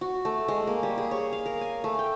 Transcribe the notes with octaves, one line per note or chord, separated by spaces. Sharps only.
F#4
A3
G#3
A#3
G3
G#4
C#5
F5
A#4
G#5
A3
G5